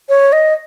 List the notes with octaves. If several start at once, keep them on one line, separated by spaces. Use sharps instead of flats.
C#5
D#5